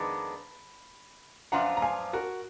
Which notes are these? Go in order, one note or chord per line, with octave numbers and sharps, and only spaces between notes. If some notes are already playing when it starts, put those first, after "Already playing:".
Already playing: F2 D#3 G#3 B3 D4 B5
F#2 F3 B3 D4 F4 F#5 A#5
A#5
F5 G#5
F#4 A#4